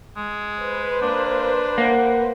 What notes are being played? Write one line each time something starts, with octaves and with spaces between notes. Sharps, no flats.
G#3
B4 C5
A#3 D4
A#3 F#5